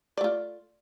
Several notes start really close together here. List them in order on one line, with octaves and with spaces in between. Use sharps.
D5 A3 F4